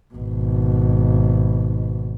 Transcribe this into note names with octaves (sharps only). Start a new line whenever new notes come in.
G#1 B2